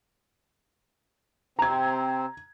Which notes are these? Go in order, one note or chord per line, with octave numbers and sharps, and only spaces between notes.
C3 C4 A#5 G#6